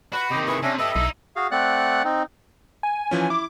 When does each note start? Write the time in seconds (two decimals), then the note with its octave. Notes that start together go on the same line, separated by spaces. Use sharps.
0.13 F#4 B4 B5
0.30 C3 D#3 G4 D#5
0.47 E4 G#4 B4 C#6
0.62 C3 C#4 D4 E5 G#5
0.79 G4 A4 B4 D#5 E5
0.96 B1 D#4 E4
1.36 F#4 G#4 F5
1.51 A3 C4 D5 F#5 F#6
2.04 C4 D#4
2.83 G#5
3.11 E3 F3 C#4
3.30 E4 D6